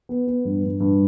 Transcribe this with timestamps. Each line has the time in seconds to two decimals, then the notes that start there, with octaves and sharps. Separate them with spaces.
0.09 B3
0.27 B3
0.45 G2
0.63 G2
0.80 G2